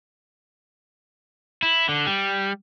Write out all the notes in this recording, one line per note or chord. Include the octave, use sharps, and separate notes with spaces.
E4
D3
G3